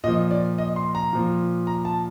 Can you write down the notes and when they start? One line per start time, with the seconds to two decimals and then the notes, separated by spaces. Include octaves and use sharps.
0.04 A#2 D#5
0.08 F3
0.31 D5
0.58 D#5
0.76 C6
0.95 A#5
1.13 A#2 F3
1.67 A#5
1.85 A5